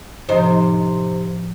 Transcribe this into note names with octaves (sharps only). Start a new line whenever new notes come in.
A2 C3 F3 D#4 C5